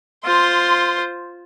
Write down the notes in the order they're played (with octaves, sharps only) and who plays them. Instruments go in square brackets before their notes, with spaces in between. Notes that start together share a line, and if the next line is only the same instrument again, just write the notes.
[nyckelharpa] F4 C5 [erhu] C6